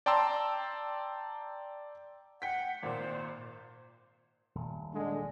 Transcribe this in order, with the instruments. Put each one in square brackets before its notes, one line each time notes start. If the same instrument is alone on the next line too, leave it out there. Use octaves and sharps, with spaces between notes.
[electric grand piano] D5 G5 A5 A#5 C6 E6
[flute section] F#5 [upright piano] G5 B6
[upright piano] G#1 A#2 [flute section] C5 D6
[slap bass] D#1
[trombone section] D3 G#3